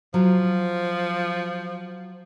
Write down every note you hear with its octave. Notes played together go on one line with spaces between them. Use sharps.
F3 F#3 F4